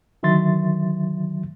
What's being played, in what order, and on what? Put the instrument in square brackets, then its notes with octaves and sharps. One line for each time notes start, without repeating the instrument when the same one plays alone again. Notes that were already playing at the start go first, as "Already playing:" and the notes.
[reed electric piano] D3 D#3 F#3 E5 C6 A6